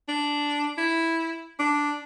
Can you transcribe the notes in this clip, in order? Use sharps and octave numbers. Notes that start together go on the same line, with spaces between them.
D4
E4
D4